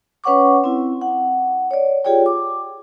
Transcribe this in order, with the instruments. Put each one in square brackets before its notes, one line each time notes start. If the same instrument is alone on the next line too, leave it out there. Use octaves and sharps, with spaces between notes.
[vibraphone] C#4 B4 C#5 F#5 C#6 D6
C4 E4
F#5
C#5 D5
F4 G4 G#4 C#5 D5 G5
D6